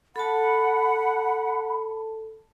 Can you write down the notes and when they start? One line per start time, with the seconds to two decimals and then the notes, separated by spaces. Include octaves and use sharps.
0.16 A4 F#5 A5 B5